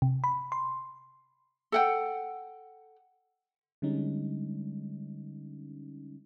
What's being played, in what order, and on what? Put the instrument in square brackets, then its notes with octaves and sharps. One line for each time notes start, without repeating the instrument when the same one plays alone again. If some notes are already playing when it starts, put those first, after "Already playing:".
[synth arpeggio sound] C3
B5
C6
[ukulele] A4 F#5 G5
[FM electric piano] D3 G3 G#3 C#4 D#4